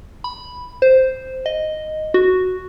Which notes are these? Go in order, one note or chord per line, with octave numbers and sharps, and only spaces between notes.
B5
C5
D#5
F#4